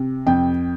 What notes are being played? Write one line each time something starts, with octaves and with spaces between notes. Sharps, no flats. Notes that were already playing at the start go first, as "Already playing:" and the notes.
Already playing: C3
F2 G5